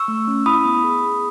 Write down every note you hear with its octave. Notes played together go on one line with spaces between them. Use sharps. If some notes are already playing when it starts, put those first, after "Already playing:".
Already playing: C#6 E6
A3
C#4
E4 B5 D#6
B3
G#4
G#4